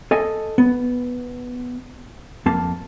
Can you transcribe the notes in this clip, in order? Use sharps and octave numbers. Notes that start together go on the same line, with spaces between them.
A4 D#5 G#5
B3
F2 A#3 A5